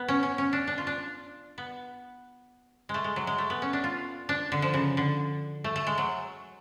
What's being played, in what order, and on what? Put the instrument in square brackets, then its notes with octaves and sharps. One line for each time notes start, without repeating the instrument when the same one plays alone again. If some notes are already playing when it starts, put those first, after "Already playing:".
Already playing: [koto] B3
C#4
C#4
C#4
D4
D4
F4
D4
B3
G#3
A3
G#3
F#3
G#3
A3
B3
C#4
D4
F4
D4
D3
F3
C#3
D3
A3
A3
G#3
F#3